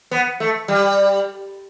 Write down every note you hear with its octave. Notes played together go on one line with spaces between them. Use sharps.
B3
A3
G3